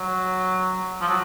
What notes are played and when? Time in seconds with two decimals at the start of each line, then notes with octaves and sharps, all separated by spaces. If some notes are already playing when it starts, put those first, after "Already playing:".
Already playing: F#3
1.01 F3
1.08 F#3